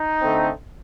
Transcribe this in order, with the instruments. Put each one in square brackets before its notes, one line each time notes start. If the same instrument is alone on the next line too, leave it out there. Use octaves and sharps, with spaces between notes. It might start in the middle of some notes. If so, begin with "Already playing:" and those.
Already playing: [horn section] D#4
D3 A3 C4